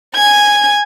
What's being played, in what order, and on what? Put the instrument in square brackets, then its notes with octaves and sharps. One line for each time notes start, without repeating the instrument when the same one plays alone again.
[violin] G#5 G#6